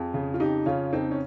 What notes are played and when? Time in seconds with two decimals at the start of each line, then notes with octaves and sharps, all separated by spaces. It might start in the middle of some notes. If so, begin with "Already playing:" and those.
Already playing: F2 F4 G#4
0.14 C#3
0.34 F4
0.40 F2 D#4 G4
0.66 C#3 C#4 F4
0.93 F2 C4 D#4
1.11 C#4